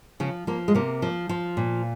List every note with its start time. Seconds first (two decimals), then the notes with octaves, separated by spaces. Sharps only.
0.20 C#3 F3 C#4
0.47 F3 A#3
0.68 G#3
0.75 C3 A#3
1.02 F3
1.29 F3
1.57 A#2